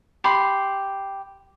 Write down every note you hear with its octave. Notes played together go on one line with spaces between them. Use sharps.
G4 B5 C6